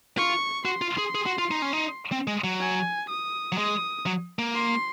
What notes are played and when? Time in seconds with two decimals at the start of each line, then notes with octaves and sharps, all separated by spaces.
0.17 F4 C#6
0.65 F#4 C6
0.82 F4
0.98 G#4
1.15 G#4
1.26 F#4
1.39 F4
1.51 D#4
1.62 C#4
1.73 D#4
2.12 C4
2.27 G#3
2.44 F#3
2.60 G#5
3.10 D#6
3.52 F#3
3.57 G#3 D#6
4.06 F#3
4.39 A#3
4.54 C6